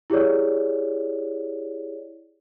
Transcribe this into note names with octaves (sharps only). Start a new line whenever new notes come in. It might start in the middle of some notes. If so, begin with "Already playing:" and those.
E4 G4 G#4 C#5 D5